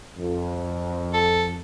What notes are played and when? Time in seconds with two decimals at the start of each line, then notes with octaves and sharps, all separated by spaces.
0.18 F2
1.13 A4